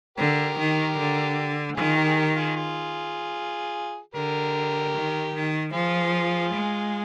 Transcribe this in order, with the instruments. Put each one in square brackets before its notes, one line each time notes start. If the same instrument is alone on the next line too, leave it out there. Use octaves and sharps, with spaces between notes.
[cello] D3 [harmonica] G4 A#4
[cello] D#3
D3
[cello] D#3 [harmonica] F4 G#4
[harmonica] G4 A#4
G#4
G4 A#4
F4 G#4
F4 G#4
[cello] D3 [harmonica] G4 A#4
[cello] D#3
D#3
[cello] F3 [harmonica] F4 G#4
[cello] G#3